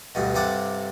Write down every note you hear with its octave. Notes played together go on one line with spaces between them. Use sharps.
D2 G2 B2
G2 C3 A4 D5 F#5